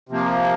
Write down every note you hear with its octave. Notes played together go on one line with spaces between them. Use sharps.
C3 F3 A#3